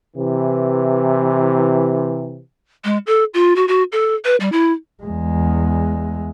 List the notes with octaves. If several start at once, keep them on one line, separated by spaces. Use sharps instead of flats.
C3 E3
G#3
A4
F4
F#4
F#4
A4
B4
G3
E4
E2 G#3